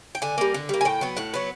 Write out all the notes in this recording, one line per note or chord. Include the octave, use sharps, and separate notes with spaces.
G5
D3 G#5
G3 A#3
D3
G3 A#3
G#5
A2 G5
F#3 B3
A2 F#5
F#3 B3